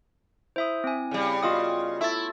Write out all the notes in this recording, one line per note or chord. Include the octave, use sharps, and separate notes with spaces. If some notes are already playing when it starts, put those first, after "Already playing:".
E4 C5 E5 D#6
C4 G#5
C#3 G3 F5
B3 F4 F#4 D#5 F5 D#6
A3 E4 E6 A6